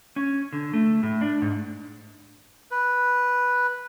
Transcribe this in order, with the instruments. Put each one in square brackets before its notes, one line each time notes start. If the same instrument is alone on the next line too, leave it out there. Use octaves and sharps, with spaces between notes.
[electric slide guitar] C#4
D3
A3
A2
D4
G#2
[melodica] B4